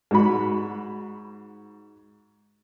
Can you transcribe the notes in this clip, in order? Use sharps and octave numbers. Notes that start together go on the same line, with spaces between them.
G#2 F#4 B5